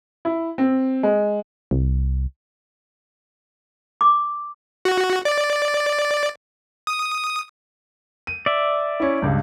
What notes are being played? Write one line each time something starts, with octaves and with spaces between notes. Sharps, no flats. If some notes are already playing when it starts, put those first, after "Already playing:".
E4
C4
G#3
C2
D6
F#4
D5
D#6
D#7
D5 E5
C#4 E4
C#2 G2